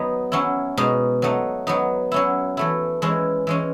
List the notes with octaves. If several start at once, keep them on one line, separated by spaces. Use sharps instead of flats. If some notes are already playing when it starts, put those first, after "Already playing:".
Already playing: F#3 B3 D#4
F#3 C#4 E4
B2 G#3 D#4
F#3 A3 D#4
F#3 B3 D#4
F#3 C#4 E4
E3 A3 E4
E3 G#3 C#4 E4
E3 G#3 C#4